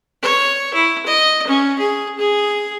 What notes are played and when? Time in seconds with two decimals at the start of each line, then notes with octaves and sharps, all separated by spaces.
0.22 C#5
0.74 E4
1.06 D#5
1.47 C#4
1.79 G#4
2.19 G#4